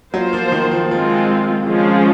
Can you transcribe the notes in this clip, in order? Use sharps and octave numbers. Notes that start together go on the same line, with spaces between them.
F#3 A#3 F4 C5
F3
D#3
F3
F3 G#3 C4 F4
F3 G#3 C#4 F4 G#4